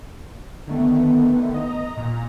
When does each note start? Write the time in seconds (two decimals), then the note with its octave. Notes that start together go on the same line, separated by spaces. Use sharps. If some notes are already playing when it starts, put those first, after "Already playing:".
0.67 D3 D#3 A3 B3
1.54 D#5 A#5
1.97 A#2